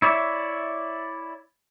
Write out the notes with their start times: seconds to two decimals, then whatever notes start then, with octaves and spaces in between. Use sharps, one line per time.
0.02 E4 C#5 D5 E5